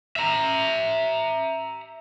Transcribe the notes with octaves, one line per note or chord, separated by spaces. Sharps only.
E5 A#5